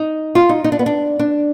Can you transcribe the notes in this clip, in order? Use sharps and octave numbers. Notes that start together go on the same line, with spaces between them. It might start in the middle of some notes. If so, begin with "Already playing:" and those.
Already playing: D#4
F4
D#4
D#4
D4
B3
D4
D4